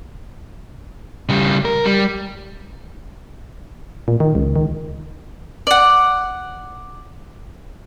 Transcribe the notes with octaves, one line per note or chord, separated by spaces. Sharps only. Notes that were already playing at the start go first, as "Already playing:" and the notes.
C#3 G3
A#4
G3
A#2
D#3
C#2
D#3
D5 F#5